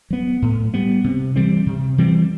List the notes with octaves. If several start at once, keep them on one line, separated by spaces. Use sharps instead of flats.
F#3 B3
A2
G3 B3
C3
E3 G3 C4
C3
E3 G3 C4